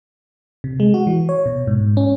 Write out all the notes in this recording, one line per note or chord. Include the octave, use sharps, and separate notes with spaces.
C3
G#3
F#4
E3
C#5
B2
G#2
C#4